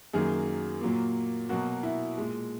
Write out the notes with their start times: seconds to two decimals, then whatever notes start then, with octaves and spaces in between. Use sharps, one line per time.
0.14 F#2 D#3 F#3 A#3 G#4
0.81 A#2 F#3 A#3
1.49 B2 F#3 A#3 F#4
1.83 E4
2.18 A#2 G#3